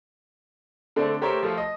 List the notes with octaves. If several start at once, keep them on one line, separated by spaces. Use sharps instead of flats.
D3 A3 C4 D4
A3 G4 A#4 C5 C#5 E5
F3 A3 F4
D#5